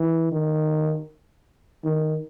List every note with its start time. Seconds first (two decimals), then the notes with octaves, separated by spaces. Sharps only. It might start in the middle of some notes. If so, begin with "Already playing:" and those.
Already playing: E3
0.32 D#3
1.84 D#3